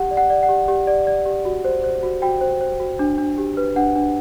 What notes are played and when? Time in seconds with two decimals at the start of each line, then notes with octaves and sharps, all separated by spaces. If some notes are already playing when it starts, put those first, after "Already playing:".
Already playing: G4 F#5
0.11 D5
0.17 F#5
0.30 D5
0.43 F#5
0.49 G4
0.68 G4
0.87 D5
1.07 D5
1.26 G4
1.45 F#4
1.65 C5
1.84 C5
2.03 F#4
2.22 F#4 G5
2.41 C5
2.61 C5
2.80 F#4
2.99 D4
3.18 D4
3.38 G4
3.57 B4
3.76 D4 F#5
3.96 D4